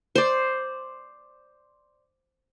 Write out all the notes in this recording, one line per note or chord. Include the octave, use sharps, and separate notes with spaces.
C5 D5